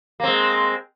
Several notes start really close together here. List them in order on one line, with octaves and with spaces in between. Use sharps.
A#3 C4 G#3